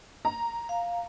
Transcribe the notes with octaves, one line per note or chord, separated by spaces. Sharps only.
A#5
F5